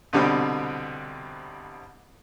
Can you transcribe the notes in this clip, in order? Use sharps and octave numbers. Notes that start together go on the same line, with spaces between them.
C2 B2 D3 G3 C4